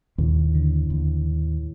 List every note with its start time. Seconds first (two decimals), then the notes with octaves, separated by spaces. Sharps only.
0.18 D#2 A2
0.55 D3
0.90 D#2